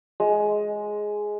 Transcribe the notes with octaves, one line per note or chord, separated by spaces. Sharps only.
G#3